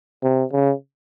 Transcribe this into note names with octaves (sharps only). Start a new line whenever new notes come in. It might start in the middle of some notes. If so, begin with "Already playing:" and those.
C3
C#3